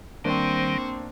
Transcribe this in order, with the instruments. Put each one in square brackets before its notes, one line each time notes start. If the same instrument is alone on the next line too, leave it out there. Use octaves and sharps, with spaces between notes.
[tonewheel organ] D#3 G3 [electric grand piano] A#3 D4 [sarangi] C4 [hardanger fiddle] C5 C#6